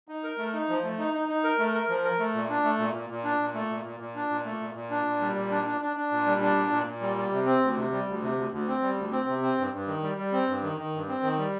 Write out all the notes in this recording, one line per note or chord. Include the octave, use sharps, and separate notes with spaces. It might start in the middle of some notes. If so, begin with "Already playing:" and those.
D#4
A#4
A3
D#4
F3
A3
D#4
D#4
D#4
A#4
A3
A#4
F3
A#4
A3
A#2
D4
A3
A#2
A#2
A#2
D4
A#2
A3
A#2
A#2
A#2
D4
A#2
A3
A#2
A#2
D4
A#2
G3
A#2
D4
D4
D4
D4
A#2
G3
D4
A#2
A#2
A#2
G3
G3
C3
C4
D2
C3
G3
D2
C3
D2
D2
C4
G3
D2
C4
C3
C4
G2
G2
D#3
G3
G3
C4
G2
D#3
D#3
G2
C4
D#3
G3